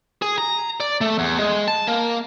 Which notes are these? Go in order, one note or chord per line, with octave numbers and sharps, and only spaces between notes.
G#4
A#5
D5
A3
E2
G#3
A5
A#3